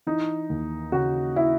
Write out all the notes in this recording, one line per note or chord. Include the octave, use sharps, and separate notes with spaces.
E3 D#4
D#2
C#3 F#4
E4